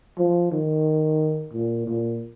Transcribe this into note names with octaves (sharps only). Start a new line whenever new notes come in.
F3
D#3
A#2
A#2